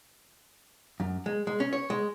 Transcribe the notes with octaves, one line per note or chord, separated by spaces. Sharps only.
F#2
G#3
G#3
C#4
C#5
G#3